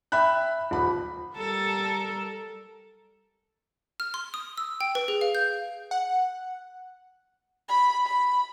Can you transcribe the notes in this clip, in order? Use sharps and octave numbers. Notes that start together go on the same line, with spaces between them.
E5 G5 B5 F#6
D#1 B5
G3 A4 A#4
F6
C6
D#6
E6
G5
B4
G#4
F5
G6
F#5
B5
B5